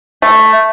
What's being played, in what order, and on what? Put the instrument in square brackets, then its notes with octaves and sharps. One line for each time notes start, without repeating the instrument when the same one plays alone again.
[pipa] A3